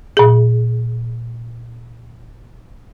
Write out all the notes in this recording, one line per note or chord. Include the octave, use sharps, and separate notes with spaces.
A#2 G#4